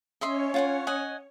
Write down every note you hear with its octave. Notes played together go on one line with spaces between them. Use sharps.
C#4 C#5 D#5 E5 C6
F4 F#5 G#5
D#5 F#5 G#5